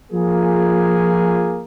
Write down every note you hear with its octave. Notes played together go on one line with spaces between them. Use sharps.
F3 A#3 G#4